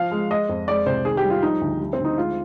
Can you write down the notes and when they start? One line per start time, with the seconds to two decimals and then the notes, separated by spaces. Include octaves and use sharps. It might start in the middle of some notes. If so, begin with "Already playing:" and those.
Already playing: F3 F5
0.11 G#3
0.31 G#3 D#5
0.49 F2
0.68 G#3 D5
0.86 C2 C5
1.05 D#3 G#4
1.17 G4
1.24 G3
1.30 F4
1.43 F3 D#4
1.61 D2
1.80 G3
1.93 C4
1.99 D2
2.05 D#4
2.17 G#3 F4